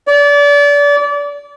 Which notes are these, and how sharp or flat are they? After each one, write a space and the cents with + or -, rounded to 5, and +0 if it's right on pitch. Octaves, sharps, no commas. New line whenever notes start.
D5 -30